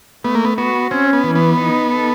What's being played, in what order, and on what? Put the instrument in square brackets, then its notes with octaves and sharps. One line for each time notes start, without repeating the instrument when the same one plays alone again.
[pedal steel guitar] A3 [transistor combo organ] B3
[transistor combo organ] A#3
B3
[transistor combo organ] B3 [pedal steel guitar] F#4
[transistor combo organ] C4 [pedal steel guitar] C#4
[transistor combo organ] B3
[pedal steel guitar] E3
[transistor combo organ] B3
[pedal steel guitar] D#4
A4